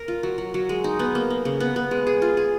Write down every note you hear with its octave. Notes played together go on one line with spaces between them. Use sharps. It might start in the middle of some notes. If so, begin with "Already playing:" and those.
Already playing: A#4
F4
F#3
F#3
F#3
G#3
D#4
B3
A#3
A#3
C#3
B3
B3
G#3
G#4
F4
G#4